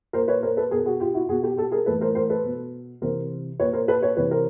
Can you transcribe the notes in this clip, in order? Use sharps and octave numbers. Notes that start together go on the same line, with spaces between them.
A#2 A#4 C5
B4 C#5
A#4 C5
A4 B4
B2 G#4 A#4
F#4 G#4
F4 G4
E4 F#4
B2 F#4 G#4
G4 A4
G4 A4
G#4 A#4
A2 E3 A4 B4
A#4 C5
A#4 C5
A4 B4
B2
C3 E3 A#4 C5
A#2 B4 C#5
A#4 C5
A4 B4
B4 C#5
C3 E3 B4 C#5
A#4 C5